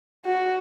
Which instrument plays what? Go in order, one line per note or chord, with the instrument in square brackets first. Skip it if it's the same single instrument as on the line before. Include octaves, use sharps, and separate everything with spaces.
[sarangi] F#4